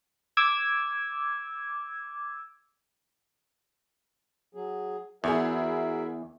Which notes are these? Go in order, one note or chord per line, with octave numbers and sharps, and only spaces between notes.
D6 E6 G#6
F#3 G#4
E2 E4 F#4 G#4 A#4 E5